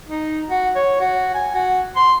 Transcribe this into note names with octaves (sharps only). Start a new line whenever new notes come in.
D#4
F#4
C#5
F#4
G#5
F#4
C6